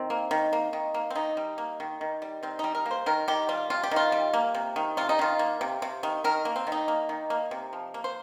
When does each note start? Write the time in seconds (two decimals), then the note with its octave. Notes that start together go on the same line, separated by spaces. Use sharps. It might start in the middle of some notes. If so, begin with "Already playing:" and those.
Already playing: D#3 C4
0.10 A#3
0.31 D#3
0.53 A#3
0.73 D#3
0.94 A#3
1.10 C4
1.15 D#3 D#4
1.37 G3
1.58 A#3
1.80 D#3
2.01 D#3
2.22 G3
2.43 D#3 C4
2.59 G3 D#4
2.75 A#4
2.86 A#3
2.91 C5
3.06 D#3 A#4
3.28 D#3 G4
3.49 G3 F4
3.70 C3 F4
3.83 G4
3.91 D#3 F4
4.12 G3
4.34 A#3
4.55 C3
4.76 D#3
4.97 C3 F4
5.09 D#4
5.19 D#3 F4
5.39 A#3
5.61 C3
5.82 C3
6.03 D#3
6.24 D#3 A#4
6.45 A#3
6.56 C4
6.67 D#3
6.72 D#4
6.88 A#3
7.09 D#3
7.30 A#3
7.51 C3
7.73 F3
7.94 A#3
8.04 C5